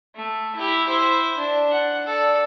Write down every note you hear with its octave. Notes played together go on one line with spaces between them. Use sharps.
A3
E4 G4
E4 C5
D4
F#5
A4 D5